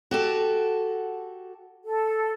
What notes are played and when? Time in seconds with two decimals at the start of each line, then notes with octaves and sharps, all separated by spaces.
0.11 F#4 G4 A4
1.85 A4